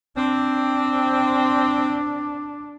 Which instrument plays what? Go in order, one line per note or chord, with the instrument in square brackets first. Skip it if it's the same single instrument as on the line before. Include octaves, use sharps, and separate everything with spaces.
[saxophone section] C4 [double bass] D4